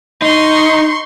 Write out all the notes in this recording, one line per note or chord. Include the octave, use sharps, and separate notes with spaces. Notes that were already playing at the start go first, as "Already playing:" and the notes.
D#4 C6 C#6